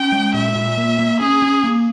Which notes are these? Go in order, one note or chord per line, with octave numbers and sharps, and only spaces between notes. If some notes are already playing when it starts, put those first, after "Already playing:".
Already playing: C#4 G5
G#3
A#2 E5
A#2
A#3
A#3
C#4 G#4
C#4
A#3